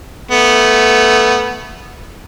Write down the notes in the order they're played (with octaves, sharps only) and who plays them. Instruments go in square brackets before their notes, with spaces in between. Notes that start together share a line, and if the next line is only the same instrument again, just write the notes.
[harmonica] A3 B3